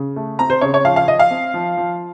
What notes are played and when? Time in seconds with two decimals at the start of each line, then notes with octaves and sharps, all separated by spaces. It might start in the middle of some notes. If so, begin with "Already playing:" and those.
Already playing: C#3
0.16 A3
0.39 C4 A#5
0.50 C5
0.61 C#3 C#5
0.74 C#5
0.85 F3 F5
0.96 F5
1.08 F3 D#5
1.19 F5
1.31 C4
1.54 F3
1.77 F3